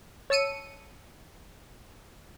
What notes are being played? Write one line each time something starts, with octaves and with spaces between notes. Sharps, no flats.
C#5 A5 E6 C#7 D#7